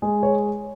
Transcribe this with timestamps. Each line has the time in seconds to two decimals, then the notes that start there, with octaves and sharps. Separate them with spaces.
0.02 G#3 G#4
0.23 C#5